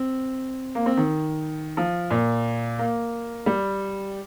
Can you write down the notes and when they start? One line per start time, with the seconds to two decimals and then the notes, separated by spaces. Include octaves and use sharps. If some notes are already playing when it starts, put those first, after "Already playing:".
Already playing: C4
0.75 A#3
0.86 C4
0.97 D#3
1.77 F3
2.10 A#2
2.79 A#3
3.46 G3